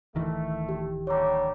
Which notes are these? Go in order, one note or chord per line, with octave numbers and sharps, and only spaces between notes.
D1 D#3 E3 A3
G4
A2 D3 G3 C#5 A#5